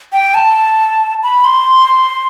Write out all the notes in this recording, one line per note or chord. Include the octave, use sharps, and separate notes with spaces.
G5
A5
B5
C6